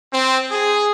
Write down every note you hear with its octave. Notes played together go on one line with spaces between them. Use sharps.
C4
G#4